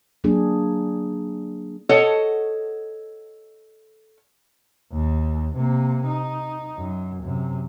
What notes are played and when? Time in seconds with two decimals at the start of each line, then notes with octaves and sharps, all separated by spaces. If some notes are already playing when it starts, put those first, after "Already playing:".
0.24 F#3 A#3 D4 G#4
1.89 A4 C#5 D#5 F#5
4.93 D#2
5.56 C3 A#3
6.06 D#4
6.77 F#2
7.23 F#2 C3